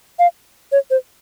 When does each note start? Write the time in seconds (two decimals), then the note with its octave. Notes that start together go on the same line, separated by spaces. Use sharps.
0.19 F5
0.72 C#5
0.90 C5